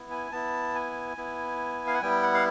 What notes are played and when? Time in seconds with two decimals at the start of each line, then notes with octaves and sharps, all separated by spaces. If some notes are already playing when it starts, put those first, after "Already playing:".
Already playing: B3 E4
0.11 G#5
0.32 B3 E4 A5
0.75 G#5
1.17 B3 E4
1.87 F5
1.94 F#5
2.02 G3 B3 E4 G5
2.23 F#5
2.34 F5